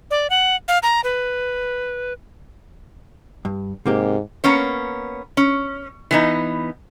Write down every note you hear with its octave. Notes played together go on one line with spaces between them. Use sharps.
D5
F#5
F5
A#5
B4
G2
G#2 C3 A#3 G4
A#3 B3 C#4 C#5
C#4
E3 B3 D#4